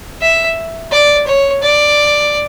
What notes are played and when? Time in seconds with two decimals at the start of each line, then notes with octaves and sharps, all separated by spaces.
0.21 E5
0.92 D5
1.27 C#5
1.62 D5